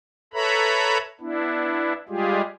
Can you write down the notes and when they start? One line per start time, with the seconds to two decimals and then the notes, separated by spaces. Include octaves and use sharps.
0.33 A4 B4 C#5 E5 A#5 B5
1.20 B3 D4 E4
2.09 G3 G#3 F4 G4 G#4